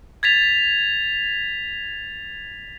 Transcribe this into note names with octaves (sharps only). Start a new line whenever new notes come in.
G#6 A6 B6 F7